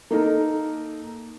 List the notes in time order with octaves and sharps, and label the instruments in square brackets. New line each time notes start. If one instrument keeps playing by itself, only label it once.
[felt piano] A#3 D#4 A4 A#4